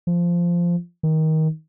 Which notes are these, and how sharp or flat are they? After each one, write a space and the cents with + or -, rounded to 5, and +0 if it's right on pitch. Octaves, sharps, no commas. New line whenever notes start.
F3 -10
D#3 +20